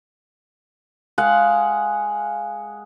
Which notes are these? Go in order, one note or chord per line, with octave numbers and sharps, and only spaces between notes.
G#3 F5 F#5